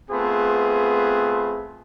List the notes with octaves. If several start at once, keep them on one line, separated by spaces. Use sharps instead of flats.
A3 B3 C4 F4 G#4 B4